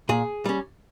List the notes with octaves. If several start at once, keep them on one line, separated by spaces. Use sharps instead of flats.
A#2 G#4
G3 C#4